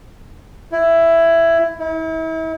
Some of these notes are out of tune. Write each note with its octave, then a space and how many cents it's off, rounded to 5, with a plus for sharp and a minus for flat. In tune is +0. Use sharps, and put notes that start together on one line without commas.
E4 +10
E4 -40